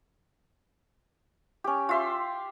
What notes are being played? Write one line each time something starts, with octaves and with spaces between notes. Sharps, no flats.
C#4 G4
F4 E5 C6